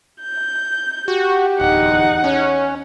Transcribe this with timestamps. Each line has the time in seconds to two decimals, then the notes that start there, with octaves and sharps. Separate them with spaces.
0.21 G6
1.08 F#4 G4
1.60 D1 E2 D#4 F#5
2.24 C#4 C#5